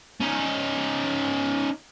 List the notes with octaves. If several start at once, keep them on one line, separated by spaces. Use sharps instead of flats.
C#4 D#4